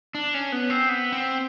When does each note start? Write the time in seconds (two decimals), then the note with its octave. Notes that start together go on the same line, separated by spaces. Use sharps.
0.15 D4
0.34 C#4
0.52 B3
0.70 C4
0.89 B3
1.12 C4